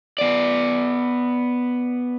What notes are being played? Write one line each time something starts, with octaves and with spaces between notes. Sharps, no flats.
B3 D5